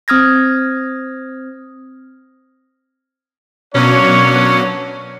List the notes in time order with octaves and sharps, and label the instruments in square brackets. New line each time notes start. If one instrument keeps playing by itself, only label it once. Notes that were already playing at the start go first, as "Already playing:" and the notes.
[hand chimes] C4 D#6 F6 G#6 A#6
[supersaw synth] B2 F#3 D#7 [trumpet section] A#3 D4 C#5 [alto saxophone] C#4